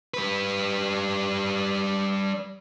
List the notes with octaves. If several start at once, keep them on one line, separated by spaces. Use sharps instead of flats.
G3 B4